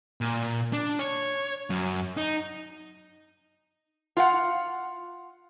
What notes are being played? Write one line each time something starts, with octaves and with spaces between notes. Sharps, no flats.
A#2
D4
C#5
F#2
D#4
F4 F5 F#5